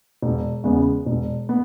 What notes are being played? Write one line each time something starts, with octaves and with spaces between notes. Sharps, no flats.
E1
E2 C#3 G#3 B3
E1
B3